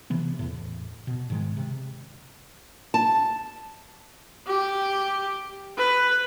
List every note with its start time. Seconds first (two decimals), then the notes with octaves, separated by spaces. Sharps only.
0.10 C3 E3 B3
0.39 E2 A2
1.07 B2
1.30 G#2 D#3 G#3
1.57 C3
2.94 A5
4.48 G4
5.78 B4